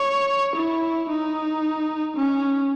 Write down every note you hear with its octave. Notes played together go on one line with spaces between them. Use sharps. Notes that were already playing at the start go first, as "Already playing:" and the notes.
Already playing: C#5
E4
D#4
C#4